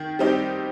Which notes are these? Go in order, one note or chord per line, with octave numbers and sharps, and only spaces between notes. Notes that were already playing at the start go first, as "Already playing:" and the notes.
Already playing: D#3
G3 C4 D#4 G4